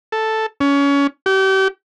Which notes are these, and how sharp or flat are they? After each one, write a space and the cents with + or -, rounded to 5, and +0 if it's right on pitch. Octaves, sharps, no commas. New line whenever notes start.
A4 +0
C#4 +25
G4 -35